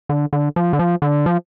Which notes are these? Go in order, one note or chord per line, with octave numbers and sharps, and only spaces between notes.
D3
D3
F3
D3
F3
D3
F3